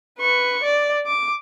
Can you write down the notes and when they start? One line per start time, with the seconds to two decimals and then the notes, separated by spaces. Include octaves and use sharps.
0.18 B4 C#6
0.64 D5
1.07 D6